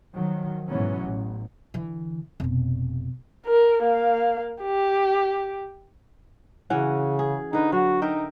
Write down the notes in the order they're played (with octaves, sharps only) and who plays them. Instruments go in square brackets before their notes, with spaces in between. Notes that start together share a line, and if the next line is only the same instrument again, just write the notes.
[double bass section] D#3 F3 F#3
G#2 B2 E3 F#3 B3 C#4
A1
[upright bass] D3 E3
F1 B2
[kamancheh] A#4
A#3 F5
G4
[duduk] C#3 [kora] E3 C#4 F#4
[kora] G#4
[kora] D3 B4 [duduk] D#4
[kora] F#3 [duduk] F#4
[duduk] D#4 [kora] A#4 E5 G5